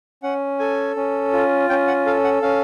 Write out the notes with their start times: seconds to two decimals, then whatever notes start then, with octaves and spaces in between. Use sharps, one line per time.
0.23 C#4 F#5
0.59 A4 G#5
0.96 C#4
1.33 F4
1.69 C#4 G5
1.87 F#5
2.06 A4 F5
2.24 F#5
2.42 C#4 F5